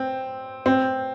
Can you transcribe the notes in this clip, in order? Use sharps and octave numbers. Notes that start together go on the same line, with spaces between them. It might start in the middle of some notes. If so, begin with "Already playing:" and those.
Already playing: C4
C4